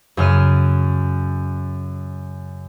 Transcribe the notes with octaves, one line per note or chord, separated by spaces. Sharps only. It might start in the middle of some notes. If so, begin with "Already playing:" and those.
F#2 C#3 F6 D#7